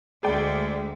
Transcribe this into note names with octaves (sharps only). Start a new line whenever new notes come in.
D2 G#3 G#4 D5 G5